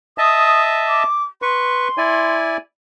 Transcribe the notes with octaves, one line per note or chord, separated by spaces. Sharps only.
D#5 E5 A5 D#6
D6
B4 C6 C#6
E4 D5 G#5